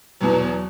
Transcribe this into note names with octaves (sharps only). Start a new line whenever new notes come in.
E2 B2 F#3